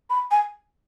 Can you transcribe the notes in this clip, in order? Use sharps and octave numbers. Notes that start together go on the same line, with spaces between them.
B5
G#5